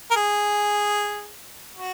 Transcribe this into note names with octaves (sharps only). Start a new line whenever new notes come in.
A#4
G#4
F#4